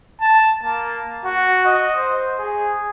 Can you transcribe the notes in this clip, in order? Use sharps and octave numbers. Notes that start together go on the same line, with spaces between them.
A5
A#3
F#4
D#5
C5
G#4